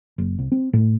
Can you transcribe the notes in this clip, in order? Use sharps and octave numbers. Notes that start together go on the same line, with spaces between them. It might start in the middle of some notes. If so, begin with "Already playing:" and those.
F#1
C2
C4
A2